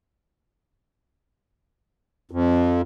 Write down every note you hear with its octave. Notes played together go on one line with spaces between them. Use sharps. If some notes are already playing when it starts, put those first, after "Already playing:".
F2